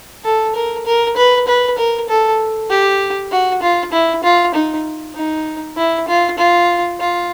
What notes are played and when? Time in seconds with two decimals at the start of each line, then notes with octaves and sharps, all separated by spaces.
0.24 A4
0.55 A#4
0.86 A#4
1.17 B4
1.47 B4
1.78 A#4
2.09 A4
2.70 G4
3.32 F#4
3.62 F4
3.92 E4
4.24 F4
4.54 D#4
5.15 D#4
5.77 E4
6.08 F4
6.38 F4
7.00 F4